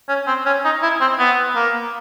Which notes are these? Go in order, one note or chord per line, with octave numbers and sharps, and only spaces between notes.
C#4
C4
C#4
D#4
E4
C4
B3
A#3